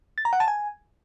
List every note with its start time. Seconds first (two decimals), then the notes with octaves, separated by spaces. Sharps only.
0.18 A6
0.25 A#5
0.33 F#5
0.40 A5
0.48 G#5